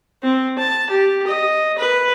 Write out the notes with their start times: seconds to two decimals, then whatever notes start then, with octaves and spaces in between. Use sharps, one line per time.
0.23 C4
0.58 A5
0.90 G4
1.27 D#5
1.78 B4